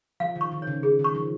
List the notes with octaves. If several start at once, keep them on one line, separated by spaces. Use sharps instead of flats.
F3 F5
D#3
C#6
D#3
C#5
C#3
C#3 G#4
D#3
C#6
F3